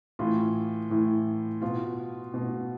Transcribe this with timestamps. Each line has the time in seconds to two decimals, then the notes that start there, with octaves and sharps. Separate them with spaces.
0.19 A2 E3 F4
0.90 A2 E3
1.61 B2 F4
2.34 B2